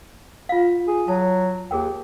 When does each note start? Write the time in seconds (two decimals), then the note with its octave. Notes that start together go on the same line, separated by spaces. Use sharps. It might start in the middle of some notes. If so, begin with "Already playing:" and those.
0.49 F4 F5
0.87 G#4
1.08 F#3 A5
1.71 D#2 G#4 A#4 G5